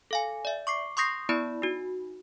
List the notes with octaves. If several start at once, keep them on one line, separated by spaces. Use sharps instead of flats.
A4 F5 G#5
D5 E5
C#6 D6 C7
C6 C#6 D#6 G6 A#6 C7
B3 E4 D5 B5
D#4 F#4